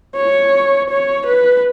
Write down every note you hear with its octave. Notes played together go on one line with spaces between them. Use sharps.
C#5
C#5
B4